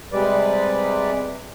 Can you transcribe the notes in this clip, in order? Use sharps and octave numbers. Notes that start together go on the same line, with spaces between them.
C3 G3 G#3 B4 D5